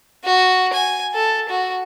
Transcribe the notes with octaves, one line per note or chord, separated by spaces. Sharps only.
F#4
G#5
A4
F#4